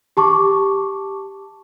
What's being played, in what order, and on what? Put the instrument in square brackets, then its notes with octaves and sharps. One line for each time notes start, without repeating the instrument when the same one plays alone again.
[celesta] G4 A5 C#6 D6